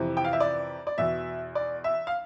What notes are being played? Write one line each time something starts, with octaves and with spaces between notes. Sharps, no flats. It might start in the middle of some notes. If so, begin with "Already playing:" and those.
Already playing: F2 C3 E3
G5
F5
E5
D5
D5
E2 B2 E5
D5
E5
F5